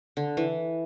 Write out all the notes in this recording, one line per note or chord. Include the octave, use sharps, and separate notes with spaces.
D3
E3